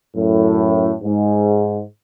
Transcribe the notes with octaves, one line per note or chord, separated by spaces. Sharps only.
F#2 A2
G#2